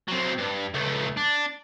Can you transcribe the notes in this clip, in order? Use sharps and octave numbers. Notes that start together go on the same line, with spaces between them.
F#3 C4
G2
C#2 A3
D4